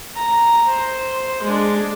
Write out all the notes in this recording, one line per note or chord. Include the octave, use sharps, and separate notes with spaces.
A#5
C5
G#3 D4